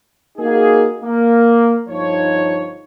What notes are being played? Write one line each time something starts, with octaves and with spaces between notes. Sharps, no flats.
A#3 D#4 F#4 G#4
A#3
G1 F3 D#4 C#5